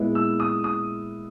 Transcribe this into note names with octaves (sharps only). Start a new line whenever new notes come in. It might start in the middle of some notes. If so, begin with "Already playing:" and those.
Already playing: A#2 G#3 B3 E4
E6
D#6
D#6